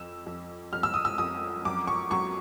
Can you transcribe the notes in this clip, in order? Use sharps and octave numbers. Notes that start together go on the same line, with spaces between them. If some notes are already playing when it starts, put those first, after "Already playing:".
Already playing: F2 E6
F2
F2 F6
E6
D#6
E6
F2 D#6
F#2 D6
C#6
F#3 C#6